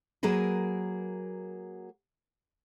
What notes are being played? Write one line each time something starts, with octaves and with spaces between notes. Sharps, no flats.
F#3 A#3 G#4 A#4 B4